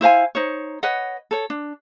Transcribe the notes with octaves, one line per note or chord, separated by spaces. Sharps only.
E4 C5 F5 G#5
D#4 C5 C#5
B4 C#5 D#5 F#5
A4 C#5
D4